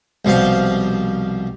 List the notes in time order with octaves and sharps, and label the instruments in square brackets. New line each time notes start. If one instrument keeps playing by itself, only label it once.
[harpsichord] C2 B2 F3 G3 F5